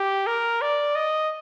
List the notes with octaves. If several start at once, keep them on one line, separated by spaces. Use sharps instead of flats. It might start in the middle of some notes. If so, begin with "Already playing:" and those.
Already playing: G4
A#4
D5
D#5